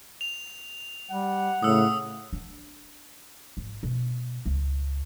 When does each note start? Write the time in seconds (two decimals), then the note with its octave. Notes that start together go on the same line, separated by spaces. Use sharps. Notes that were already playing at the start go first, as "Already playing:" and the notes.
0.21 F7
1.11 G3 F#5
1.63 A2 C#3 D#6 E6
2.33 D4
3.57 G#1
3.83 B2
4.46 C#2